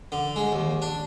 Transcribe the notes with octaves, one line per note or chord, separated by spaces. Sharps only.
D3
G#3
D#2
D4